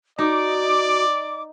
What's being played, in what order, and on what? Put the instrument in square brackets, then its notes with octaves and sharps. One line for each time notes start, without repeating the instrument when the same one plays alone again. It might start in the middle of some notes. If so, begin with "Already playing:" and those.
[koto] D#4 [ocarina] F#4 [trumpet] D5 [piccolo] D6